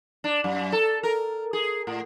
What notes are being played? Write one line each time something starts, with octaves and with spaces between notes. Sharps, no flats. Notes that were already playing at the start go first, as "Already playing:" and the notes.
D4
F#2
A4
A#4
G#4
A2